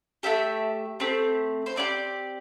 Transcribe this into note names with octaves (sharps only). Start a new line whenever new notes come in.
A3 E4 G4 E5
A3 C4 G4
C5
C4 E4 G4 D5